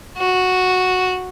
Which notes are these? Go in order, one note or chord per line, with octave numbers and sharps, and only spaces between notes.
F#4